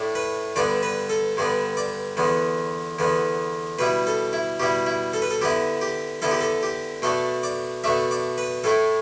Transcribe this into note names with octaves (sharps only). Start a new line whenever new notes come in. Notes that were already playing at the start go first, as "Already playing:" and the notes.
Already playing: A2 A3 D4
B4
G2 D3 B3 D4 D5
B4
A4
G2 D3 B3 D4
D5
E2 D3 B3
E2 D3 B3
B2 G3 E4 B4
A4
E4
B2 G3 E4 G4
E4
A4
B4
A4
D3 B3 E4 G4
G4
D3 B3 E4 A4
G4
A4
G4
B2 A3 D4 A4
D5
B2 A3 D4 E5
D5
B4
A2 A3 E4 A4